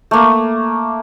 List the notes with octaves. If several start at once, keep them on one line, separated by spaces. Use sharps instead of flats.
A3 A#3